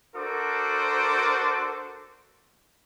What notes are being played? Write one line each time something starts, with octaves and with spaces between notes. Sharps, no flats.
D4 F#4 A4 A#4 C5 D6